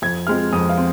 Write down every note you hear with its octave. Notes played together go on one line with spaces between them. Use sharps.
F2 G#6
F3 G#3 C4 F6
F2 D#6
F5
C4